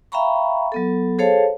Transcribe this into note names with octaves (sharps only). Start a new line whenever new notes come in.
E5 F5 G5 A#5 B5 C#6
F#3 B3 A4
G#4 A4 C5 C#5 F5 A5